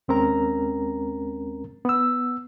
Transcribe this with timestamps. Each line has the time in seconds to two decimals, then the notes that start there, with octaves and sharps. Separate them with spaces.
0.08 D#2 G#3 C4 C#4 A#4 A#5
1.85 B3 E6